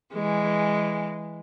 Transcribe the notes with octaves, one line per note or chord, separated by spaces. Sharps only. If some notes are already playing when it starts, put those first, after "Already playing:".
E3 G#3